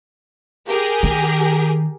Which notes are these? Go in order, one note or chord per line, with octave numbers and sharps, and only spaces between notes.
G4 G#4 A#4
D#3